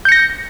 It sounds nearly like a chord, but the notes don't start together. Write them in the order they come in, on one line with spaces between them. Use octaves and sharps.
G6 C#7 A#6